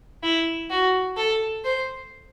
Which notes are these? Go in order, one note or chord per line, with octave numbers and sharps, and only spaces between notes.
E4
F#4
A4
C5